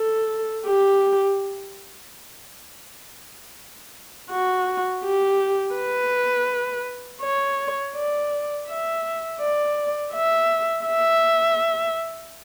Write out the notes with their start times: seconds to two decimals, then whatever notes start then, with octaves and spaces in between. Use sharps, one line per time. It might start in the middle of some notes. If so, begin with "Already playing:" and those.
Already playing: A4
0.67 G4
4.31 F#4
5.03 G4
5.76 B4
7.21 C#5
7.95 D5
8.68 E5
9.41 D5
10.13 E5
10.86 E5